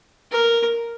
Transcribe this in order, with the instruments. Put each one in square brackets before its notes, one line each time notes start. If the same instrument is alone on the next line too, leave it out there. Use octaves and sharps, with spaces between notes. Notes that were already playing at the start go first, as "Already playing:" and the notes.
[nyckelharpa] A#4